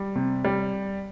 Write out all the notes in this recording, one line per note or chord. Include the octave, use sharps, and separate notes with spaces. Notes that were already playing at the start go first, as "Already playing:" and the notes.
Already playing: G3
C3
G3